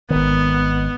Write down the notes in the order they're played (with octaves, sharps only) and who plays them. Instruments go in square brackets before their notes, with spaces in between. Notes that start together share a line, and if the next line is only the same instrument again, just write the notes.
[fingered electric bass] G#1 D#3 [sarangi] B3